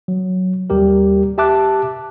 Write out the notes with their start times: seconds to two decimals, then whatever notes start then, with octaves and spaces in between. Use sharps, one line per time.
0.08 F#3
0.70 D#2 G3 G4 A#4
1.38 G4 E5 A5 D6 F#6